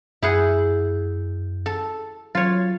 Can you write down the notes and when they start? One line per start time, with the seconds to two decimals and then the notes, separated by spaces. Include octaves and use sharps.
0.22 F#2 E4 G#4 F#5 G6
1.66 A4
2.35 F#3 F4 C#5 A6